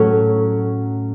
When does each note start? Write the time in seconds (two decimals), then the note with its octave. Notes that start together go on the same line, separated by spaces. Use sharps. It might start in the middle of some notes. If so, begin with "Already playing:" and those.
Already playing: A2 F#3 C#4